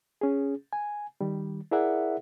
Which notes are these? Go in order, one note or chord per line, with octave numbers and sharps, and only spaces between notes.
C#4 G#4
G#5
D#3 G3
E4 G#4 A#4 D5 E5 F#5